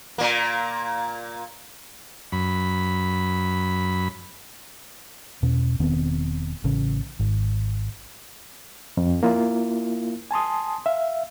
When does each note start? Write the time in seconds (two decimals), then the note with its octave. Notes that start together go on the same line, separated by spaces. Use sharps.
0.18 A#2 A#3
2.32 F#2 B5
5.42 E2 B2 C#4
5.79 E1 D#3 B3 C4
6.64 A1 C#3 C#4
7.19 G#1
8.97 F2
9.23 A#3 E4 F4
10.31 G#5 A5 C6 D#6
10.86 E5 F5